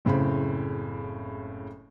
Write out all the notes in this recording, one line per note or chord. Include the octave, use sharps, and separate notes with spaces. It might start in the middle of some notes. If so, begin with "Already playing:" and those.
F#1 A2 C#3 C4 B5